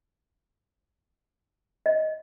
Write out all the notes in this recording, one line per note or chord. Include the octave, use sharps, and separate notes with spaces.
D#5